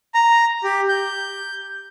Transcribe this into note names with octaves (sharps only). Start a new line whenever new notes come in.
A#5
G4
G6